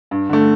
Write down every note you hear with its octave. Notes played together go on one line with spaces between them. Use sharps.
G2
D3 A3